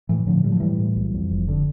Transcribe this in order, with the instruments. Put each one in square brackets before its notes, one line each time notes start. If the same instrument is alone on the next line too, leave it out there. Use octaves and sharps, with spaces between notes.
[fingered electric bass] A2 E3
A2 D3 F3
A2 G3
F3
A2 E3 G3
A2
B1
F2
F1
D3